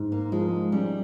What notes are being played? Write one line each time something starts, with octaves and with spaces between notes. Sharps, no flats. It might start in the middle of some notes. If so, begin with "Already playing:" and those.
Already playing: G#2
A#3
F3 G#3
G3 C#4